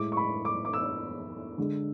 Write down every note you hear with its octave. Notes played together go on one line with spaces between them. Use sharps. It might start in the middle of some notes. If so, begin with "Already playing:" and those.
Already playing: A2 G#3 D6
C#6
B5
D6
D6
E6
D3 G#3